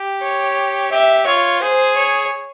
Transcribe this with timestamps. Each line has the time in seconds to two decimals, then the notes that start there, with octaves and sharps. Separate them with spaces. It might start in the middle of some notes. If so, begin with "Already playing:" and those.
Already playing: G4
0.22 C#5
0.92 G4 E5
1.27 F4 C#5
1.62 G#4 C5
1.97 C#5